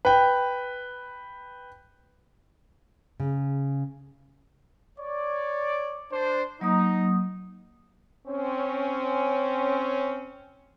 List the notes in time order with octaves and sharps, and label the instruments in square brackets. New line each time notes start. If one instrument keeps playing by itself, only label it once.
[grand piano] B4 G5
[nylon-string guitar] C#3
[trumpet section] C#5 D5
D4 C5
[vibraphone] F#3 A#3 D#6 [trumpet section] D#4
[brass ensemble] C4 C#4